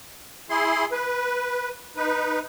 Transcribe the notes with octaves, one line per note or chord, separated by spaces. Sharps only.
E4 G#4 C6
B4
D#4 B4